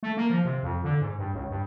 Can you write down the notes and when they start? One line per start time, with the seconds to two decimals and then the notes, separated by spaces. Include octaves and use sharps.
0.03 A3
0.17 A#3
0.30 F3
0.45 C3
0.63 F2
0.84 D3
1.01 G#2
1.19 G2
1.34 C#2
1.50 G2